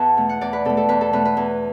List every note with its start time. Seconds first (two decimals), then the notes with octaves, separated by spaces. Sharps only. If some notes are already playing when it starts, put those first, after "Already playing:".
Already playing: E2 B4 F#5 A5
0.17 B2 A3
0.29 F#5
0.41 E2 D5
0.53 B4
0.65 B2 A3 A4
0.77 A4
0.89 E2 B4
1.01 A4
1.13 B2 A3 B4
1.25 B4
1.37 E2